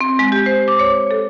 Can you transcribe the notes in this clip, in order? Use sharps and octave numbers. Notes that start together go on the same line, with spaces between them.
C4
G#3
G4
C5
D6
C#5
A4